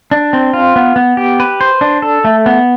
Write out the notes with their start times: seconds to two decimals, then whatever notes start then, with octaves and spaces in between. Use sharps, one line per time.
0.11 D4
0.33 C4
0.53 F4
0.76 B3
0.96 B3
1.17 G4
1.40 B4
1.61 C5
1.81 D4
2.02 A4
2.25 A3
2.46 B3